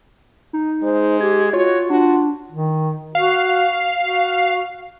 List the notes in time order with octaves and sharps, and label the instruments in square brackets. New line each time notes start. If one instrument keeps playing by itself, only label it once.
[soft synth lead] D#4
[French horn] G#3 [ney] C5
[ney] G4 [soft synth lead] G#6
[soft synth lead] F4 [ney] F#4 [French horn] C#5
[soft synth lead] D4 [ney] F4 [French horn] F#4
[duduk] D#3
[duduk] F#4 [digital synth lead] F5
[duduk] F#4